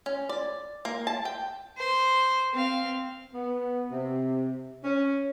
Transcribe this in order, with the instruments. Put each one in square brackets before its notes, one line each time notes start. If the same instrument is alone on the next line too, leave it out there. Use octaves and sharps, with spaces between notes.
[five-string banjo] C#4
D5
A#3
A5
G5
[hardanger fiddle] C5
C4 F5
[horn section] B3
C3
C#4